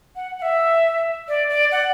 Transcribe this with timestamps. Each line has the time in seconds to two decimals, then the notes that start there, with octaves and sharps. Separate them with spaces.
0.16 F#5
0.39 F#5
0.42 E5
1.28 D5
1.50 D5
1.72 F#5